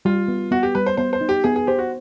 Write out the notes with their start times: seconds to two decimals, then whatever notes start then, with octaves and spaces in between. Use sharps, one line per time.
0.05 G3 F4
0.28 B3
0.51 B3 F#4
0.63 G4
0.75 G3 B4
0.86 C5
0.97 B3 C5
1.13 C5
1.21 D#4
1.29 G4
1.44 B3 G#4
1.56 G#4
1.67 G4 C5
1.79 F#4